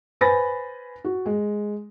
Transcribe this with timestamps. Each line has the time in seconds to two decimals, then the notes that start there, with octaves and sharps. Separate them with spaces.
0.21 B4 C5 G#5 B5 A6 A#6
1.04 F#4
1.26 G#3